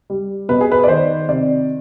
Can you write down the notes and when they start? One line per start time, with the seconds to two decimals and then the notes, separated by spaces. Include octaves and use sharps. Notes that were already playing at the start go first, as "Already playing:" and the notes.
0.10 G3
0.49 B2 B4
0.61 G#4
0.72 B4
0.84 D5
0.88 D#3 C5
1.28 C3 D5